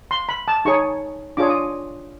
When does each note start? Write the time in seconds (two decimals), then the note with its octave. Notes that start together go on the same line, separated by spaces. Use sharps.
0.11 C6
0.29 B5
0.48 A5
0.65 D#4 G#4 C#5 C#6
1.37 D4 F4 G#4 C#5 D6
1.50 D#6